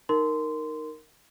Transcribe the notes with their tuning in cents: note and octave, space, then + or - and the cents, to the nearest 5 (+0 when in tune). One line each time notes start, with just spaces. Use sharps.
D#4 +0 A#4 -5 C6 -15